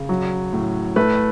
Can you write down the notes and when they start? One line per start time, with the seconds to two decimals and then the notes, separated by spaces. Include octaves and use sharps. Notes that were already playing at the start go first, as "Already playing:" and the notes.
Already playing: C#3
0.09 F#3
0.53 A2
0.96 A3 B4